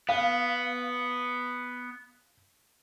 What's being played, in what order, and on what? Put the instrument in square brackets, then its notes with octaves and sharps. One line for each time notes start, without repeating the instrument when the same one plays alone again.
[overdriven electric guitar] B3 [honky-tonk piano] F5